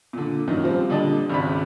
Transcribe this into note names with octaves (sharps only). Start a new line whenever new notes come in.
A#2 D3
F#2 A#2 D#3
F3 G3 C4
A#2 D3 G3 D5 D#5 A5
G#1 C#2 D5 B5